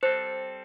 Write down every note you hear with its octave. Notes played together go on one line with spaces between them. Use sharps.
G3 C4 A4 C5